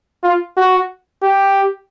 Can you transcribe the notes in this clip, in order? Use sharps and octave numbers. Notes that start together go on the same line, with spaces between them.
F4
F#4
G4